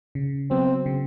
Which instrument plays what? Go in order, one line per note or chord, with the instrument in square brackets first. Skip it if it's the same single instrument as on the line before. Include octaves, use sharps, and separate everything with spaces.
[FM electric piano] C#3
[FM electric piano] F#3 B3 [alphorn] C4
[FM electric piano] C#3